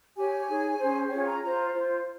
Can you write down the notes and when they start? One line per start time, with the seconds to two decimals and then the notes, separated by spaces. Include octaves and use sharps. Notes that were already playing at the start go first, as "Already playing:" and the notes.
0.16 G4 C#5 G#5
0.48 D#4 G#4 C#5
0.79 C#4 G#4 C5
1.10 C#4 F4 G#4 C#5 G5
1.27 A#5
1.42 F4 C5 A#5
1.73 F4 C5